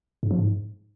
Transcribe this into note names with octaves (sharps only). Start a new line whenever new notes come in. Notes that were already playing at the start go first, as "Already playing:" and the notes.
G#2
F3
G#2